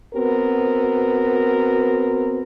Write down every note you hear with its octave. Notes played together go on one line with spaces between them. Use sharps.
B3 C4 F#4 A#4